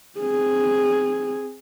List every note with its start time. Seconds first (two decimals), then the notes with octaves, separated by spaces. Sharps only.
0.18 C4 G#4